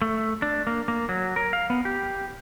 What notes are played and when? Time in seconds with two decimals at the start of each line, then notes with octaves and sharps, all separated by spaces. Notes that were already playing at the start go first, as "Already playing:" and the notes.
0.02 A3
0.42 D4
0.67 A#3
0.88 A#3
1.09 F#3
1.36 A#4
1.53 F5
1.70 B3
1.85 G4